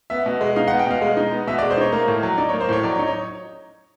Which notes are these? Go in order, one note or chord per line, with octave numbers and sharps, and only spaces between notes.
B3 E5
B2
G#3
D#4 F5
F#5
B3
G5
B2 F5
G#3
D#4
B3
B2 E5
D5
G#3
C5
D#4 C#5
A#3
A2
F#3
D#4 D5
C#5
A#3
C5
A2 C#5
F#3 D5
C#5
D#4
C#5